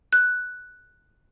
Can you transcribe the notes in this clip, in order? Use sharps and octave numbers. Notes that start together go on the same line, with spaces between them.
F#6